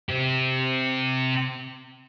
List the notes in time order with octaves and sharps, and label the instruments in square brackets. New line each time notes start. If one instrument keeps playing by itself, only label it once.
[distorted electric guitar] C4 G4